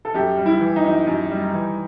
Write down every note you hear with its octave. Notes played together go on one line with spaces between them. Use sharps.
A4
F#2 G4
G3
E4
E3
D#4
F#2
F#2
G3
E3